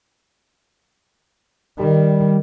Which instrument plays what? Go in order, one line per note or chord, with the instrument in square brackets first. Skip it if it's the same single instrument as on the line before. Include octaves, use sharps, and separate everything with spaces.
[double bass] D#3 [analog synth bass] G3